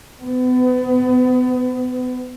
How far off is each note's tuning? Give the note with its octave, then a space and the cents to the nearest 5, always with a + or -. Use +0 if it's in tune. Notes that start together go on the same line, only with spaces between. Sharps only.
B3 +30